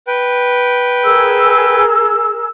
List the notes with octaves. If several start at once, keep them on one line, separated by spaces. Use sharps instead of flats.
B4 G5
G#4 A#4 E6